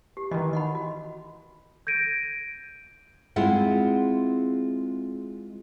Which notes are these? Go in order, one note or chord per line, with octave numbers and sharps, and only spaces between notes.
G4
D#3 E3 F#4 D#5
D#5 F#5 B5
F#4
G6 G#6 A#6 D7 D#7
G#3 C4 E4 F4 G#4 F#5